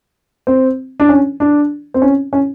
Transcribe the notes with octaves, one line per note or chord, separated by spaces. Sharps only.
C4
D4
C#4
D4
C4
C#4
C#4